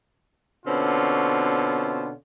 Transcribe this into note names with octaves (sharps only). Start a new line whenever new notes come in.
B2 D3 C4 C#4 F4